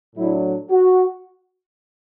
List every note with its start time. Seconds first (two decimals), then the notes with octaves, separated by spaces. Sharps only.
0.16 A2 F#3 D4 E4
0.71 F#4